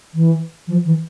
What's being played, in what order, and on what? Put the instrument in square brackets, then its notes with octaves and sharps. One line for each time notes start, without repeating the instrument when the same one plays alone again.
[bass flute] E3
F3
E3